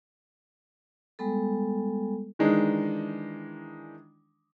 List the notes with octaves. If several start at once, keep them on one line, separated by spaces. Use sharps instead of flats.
G3 G#3 B3 A4
D#3 E3 G#3 D4 D#4